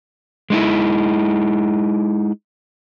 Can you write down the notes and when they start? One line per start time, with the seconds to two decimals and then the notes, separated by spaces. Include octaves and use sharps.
0.50 G#3 D#4 E4